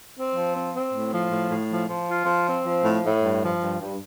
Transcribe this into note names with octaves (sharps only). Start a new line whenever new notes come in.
C4
F3
C4
C4
A2
F3
A2
A2
F3
F3
F4
F3
C4
F3
A2
A2
G2
F3
G2
G2